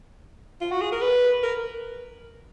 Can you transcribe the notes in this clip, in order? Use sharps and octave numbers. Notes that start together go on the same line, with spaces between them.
F4
F#4
G#4
A#4
B4
A#4